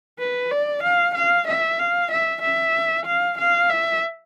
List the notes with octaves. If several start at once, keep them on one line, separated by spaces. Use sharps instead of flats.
B4
D5
F5
F5
E5
F5
E5
E5
F5
F5
E5